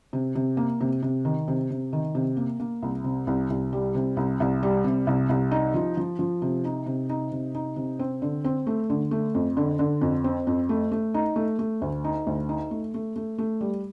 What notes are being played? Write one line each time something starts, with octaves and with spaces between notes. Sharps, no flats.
C3
C3
A#3
C3
C3
D#3
C3
C3
D#3
C3
A#3
A#3
C2
C3
C2
C2
G3
C3
C2
C2
G3
C3
C2
C2
D#4
F3
F3
F3
C3
D#4
C3
D#4
C3
D#4
C3
C4
D3
C4
A3
D3
A3
F2
D3
D3
F2
C4
F2
A3
A3
D#4
A3
A3
D2
D#4
D2
D#4
A3
A3
A3
A3
G3